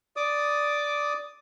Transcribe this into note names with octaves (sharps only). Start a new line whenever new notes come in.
D5 D6 D#6